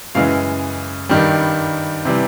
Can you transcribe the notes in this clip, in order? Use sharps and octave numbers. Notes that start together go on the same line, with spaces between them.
F#2 C#3 E3 G#3 F5
G2 D#3 G3
C3 E3 G3